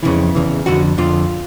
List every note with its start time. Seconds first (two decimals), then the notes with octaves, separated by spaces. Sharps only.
0.03 F2 C#3 E3 E4
0.35 E2 C#3 E3
0.66 F2 D3 F#4
0.98 F2 D3 F4